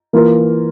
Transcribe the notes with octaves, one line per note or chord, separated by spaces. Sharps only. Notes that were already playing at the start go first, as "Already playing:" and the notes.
E3 A#3 F4 A#4